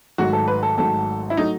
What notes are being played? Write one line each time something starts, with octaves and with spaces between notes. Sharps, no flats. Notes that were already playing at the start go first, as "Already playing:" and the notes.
G#1 G#2 F#3 A3 F#4
A4
B4
A4
G#1 G#2 F#3 A3 A4
E4
F#3 A3 D#4